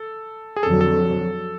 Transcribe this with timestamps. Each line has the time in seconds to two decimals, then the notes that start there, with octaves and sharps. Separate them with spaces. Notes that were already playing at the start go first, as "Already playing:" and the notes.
Already playing: A4
0.56 G#4
0.63 F2 D3 F#3 A4
0.81 A4